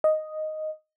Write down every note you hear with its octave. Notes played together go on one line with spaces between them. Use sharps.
D#5